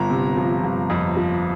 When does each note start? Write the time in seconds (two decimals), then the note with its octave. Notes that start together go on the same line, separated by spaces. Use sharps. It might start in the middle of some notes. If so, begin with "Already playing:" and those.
Already playing: G1 A#5
0.10 C3
0.37 F3
0.64 G1
0.90 F2
1.17 F3